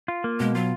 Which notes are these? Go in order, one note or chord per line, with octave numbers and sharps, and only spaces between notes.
F4
A#3
B2 G#3
F#3 F4